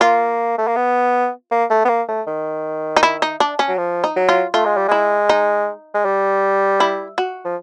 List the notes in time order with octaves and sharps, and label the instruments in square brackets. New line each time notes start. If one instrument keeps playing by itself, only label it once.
[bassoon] A#3 [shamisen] F4
[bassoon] A3
A#3
B3
A#3
A3
B3
A#3
A3
D#3
[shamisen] D#4
E4
D#4
D4
C#4
[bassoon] F#3
F3
[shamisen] D#4
[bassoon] F#3
[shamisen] F4
[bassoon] A3 [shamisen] F4
[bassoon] G#3
G3
[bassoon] G#3 [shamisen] E4
[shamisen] D#4
[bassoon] G#3
G3
[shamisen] E4
F#4
[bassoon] F3